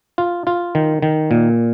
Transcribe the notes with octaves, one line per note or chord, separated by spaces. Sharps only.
F4
F4
D#3
D#3
A#2